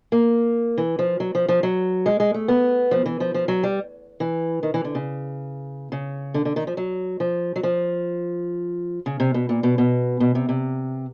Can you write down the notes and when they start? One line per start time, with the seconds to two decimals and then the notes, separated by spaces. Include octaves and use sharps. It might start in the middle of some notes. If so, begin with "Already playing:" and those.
0.12 A#3
0.78 E3
0.99 F3
1.20 F#3
1.35 F3
1.49 F3
1.63 F#3
2.06 G#3
2.20 G#3
2.34 A3
2.48 B3
2.91 F3
3.06 E3
3.20 F3
3.34 F3
3.48 F#3
3.63 G3
4.20 E3
4.63 D#3
4.74 E3
4.84 D3
4.95 C#3
5.92 C#3
6.34 D3
6.45 D3
6.56 D#3
6.67 F3
6.77 F#3
7.20 F3
7.56 F#3
7.63 F3
9.06 C#3
9.20 C3
9.34 B2
9.49 A#2
9.63 B2
9.78 B2
10.20 B2
10.35 C3
10.49 C3